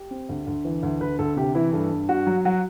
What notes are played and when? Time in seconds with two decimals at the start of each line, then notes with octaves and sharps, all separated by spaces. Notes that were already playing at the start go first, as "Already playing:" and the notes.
Already playing: G4
0.11 C4
0.29 D2
0.47 D2
0.65 E3
0.83 D2
1.00 D2 B4
1.19 D2 A4
1.37 C3 G4
1.55 E3 E4
1.73 G2 A4
1.91 G2
2.09 G2 F#4
2.27 F#3
2.45 F#3 F#4